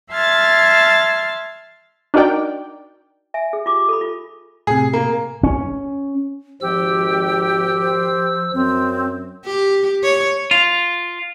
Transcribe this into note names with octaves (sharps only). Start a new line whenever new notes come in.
E5 A5 C6 F6 G#6 A6
D4 D#4 F#4 A#4 D5 G5
E5 G#5
G#4
F4 G4 D6
A4 B5
F4
A2 C3 G#4
A#3
C#4
G#1 F3 G4 E6
C5
F#2 C4
G4
C#5
F4